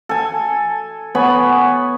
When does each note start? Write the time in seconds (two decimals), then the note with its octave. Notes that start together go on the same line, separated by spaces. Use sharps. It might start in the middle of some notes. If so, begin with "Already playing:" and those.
0.09 A4 G#5
1.15 B3 C#5 G#5 B5